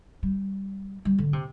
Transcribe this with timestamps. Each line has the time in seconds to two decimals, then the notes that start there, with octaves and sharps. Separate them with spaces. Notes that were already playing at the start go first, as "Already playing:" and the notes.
0.23 G3
1.05 G3
1.18 D3
1.33 C3